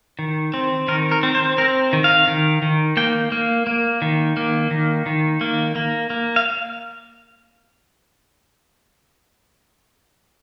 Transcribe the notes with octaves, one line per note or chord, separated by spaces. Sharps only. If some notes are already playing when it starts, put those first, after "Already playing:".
D#3
C4
D#3 A#4
A#4
C4
C5
C4 A#4
D#3
F5
D#3
D#3
A#3 G5
A#3
A#3
D#3
A#3
D#3
D#3
A#3
A#3
A#3
F5